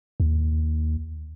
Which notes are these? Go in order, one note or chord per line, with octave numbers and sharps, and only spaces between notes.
D#2